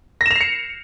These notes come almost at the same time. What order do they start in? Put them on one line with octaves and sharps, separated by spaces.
A#6 E7 F7 C7 C#7